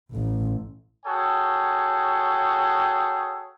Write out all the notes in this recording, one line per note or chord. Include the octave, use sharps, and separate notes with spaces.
A1
F#4 G#4 A4 C#5 G5